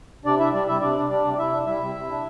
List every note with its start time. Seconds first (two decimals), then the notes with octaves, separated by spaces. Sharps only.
0.25 C3 D4 D5
0.39 D4 E4 E5
0.53 G3 D4 D5
0.67 C3 E4 E5
0.81 C3 D4 D5
0.96 D4
1.09 G3 D4 D5
1.24 C3
1.33 D5
1.38 C3 E4 E5
1.52 D4
1.66 G3 E4 E5
1.80 C3
1.95 C3
2.09 D4